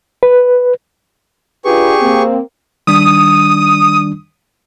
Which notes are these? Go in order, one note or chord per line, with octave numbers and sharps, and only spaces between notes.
B4
D4 F4 G4 G#4 B4 C#6
A#3 C4
D#3 G3 D4 D#6